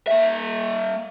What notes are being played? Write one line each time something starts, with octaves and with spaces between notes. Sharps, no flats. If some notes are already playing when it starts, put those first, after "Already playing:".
A#3 E5